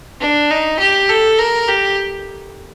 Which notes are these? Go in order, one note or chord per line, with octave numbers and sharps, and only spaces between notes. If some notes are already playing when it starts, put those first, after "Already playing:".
D4
D#4
G4
A4
A#4
G4